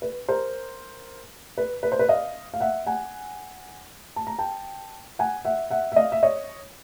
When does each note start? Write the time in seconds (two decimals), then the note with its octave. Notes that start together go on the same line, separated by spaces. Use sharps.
0.02 B4
0.29 A#4 C5
1.58 B4
1.83 B4
1.92 C5
1.99 B4
2.09 D#5 F5
2.54 F5
2.61 E5 F#5
2.87 F#5 G#5
4.16 A5
4.27 A#5
4.39 G5 A5
5.19 F#5 G#5
5.45 E5 F#5
5.71 E5 F#5
5.92 E5
5.96 D#5 F5
6.12 E5
6.23 C#5 D#5